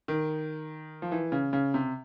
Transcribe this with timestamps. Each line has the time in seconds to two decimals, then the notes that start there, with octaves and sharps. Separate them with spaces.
0.08 D#3
1.02 F3
1.12 E3
1.32 C#3
1.53 C#3
1.74 C3